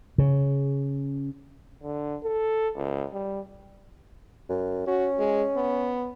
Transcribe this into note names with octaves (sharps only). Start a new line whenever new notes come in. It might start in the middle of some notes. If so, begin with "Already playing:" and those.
C#3
D3
A4
C#2
G3
F#2
C#4 F#4
G#3
B3